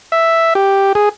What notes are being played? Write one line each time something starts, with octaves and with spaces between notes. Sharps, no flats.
E5
G4
G#4